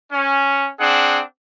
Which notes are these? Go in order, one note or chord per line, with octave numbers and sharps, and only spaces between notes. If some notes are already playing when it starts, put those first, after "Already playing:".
C#4
C4 D4 G#4 F#5